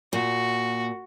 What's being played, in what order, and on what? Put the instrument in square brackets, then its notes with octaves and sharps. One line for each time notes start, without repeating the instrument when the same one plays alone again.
[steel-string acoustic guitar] A#2 [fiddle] F#4